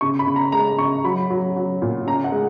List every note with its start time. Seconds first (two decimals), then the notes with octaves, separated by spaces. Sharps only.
0.01 C#3 C#6
0.19 B5
0.27 C#3
0.36 A#5
0.52 G#3 A#5
0.78 C#3 C#6
1.04 F#3 B5
1.30 F#3
1.56 F#3
1.82 A#2
2.07 C#3 A#5
2.24 F#5
2.32 G#3